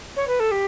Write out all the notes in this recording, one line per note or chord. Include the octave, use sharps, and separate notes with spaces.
C#5
B4
A4
G4